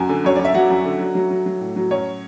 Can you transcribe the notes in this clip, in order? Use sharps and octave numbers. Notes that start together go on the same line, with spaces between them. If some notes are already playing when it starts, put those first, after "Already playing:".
Already playing: F#2 G#5
D3
F#2 C#5
F#2 D5
E5
F#3 F#5
F#2
D3
F#3
F#3
F#3
F#3
A2
F#3
F#2 C#5